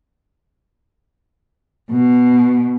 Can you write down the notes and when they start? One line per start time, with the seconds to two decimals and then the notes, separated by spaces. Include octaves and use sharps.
1.90 B2